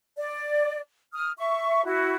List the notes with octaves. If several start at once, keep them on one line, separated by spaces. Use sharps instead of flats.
D5
D#6 F6
E5 C#6
E4 F#4